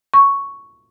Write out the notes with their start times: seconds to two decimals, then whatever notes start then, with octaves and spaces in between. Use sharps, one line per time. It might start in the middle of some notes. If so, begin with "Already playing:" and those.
0.14 C#6